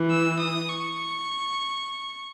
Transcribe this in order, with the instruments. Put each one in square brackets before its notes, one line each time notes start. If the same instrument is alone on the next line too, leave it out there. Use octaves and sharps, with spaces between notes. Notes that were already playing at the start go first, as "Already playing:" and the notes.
Already playing: [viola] E3
[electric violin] E6
D#6
C#6